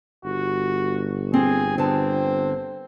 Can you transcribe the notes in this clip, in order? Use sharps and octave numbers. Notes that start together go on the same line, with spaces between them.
G1 F#4
C4 G#4
D3 B3 C4 A5